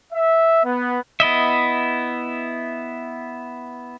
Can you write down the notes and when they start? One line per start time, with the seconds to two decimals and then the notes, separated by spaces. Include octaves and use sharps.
0.13 E5
0.64 B3
1.20 B3 E4 D#5 E5